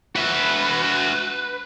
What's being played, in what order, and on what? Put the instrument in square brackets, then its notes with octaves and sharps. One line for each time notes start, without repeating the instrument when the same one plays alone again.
[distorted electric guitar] F#4 E5 [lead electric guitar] B4